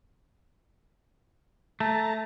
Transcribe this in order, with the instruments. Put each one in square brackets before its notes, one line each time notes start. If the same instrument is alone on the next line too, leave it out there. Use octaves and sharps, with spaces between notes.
[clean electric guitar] A3 [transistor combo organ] A4 A5 A#5